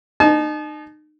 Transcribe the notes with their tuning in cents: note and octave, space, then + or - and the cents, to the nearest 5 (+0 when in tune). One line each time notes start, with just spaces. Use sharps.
D#4 -35 A5 -40